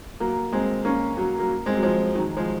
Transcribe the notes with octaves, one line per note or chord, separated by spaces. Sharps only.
F#3 A#3
G#3 C4
A#3 C#4
F#3 A#3
F#3 A#3
G#3 C4
F#3
F3 G#3
D#3 F#3
F3 G#3